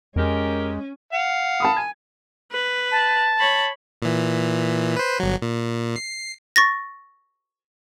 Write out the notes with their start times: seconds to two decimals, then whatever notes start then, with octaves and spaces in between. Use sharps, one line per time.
0.16 F2 G#3 C#4 G4 A#4
1.13 F5 F#5
1.60 A5 B5 D#6
1.77 G#5 G#6
2.52 B4
2.92 A5
3.39 C#5 B5
4.02 A#2 E3
4.96 B4 C5
5.20 G1 F#3
5.42 A#2
5.96 C7
6.56 C#6 A6 A#6